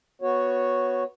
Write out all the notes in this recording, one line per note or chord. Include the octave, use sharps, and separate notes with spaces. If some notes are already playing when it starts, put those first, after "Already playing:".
B3 F#4 C#5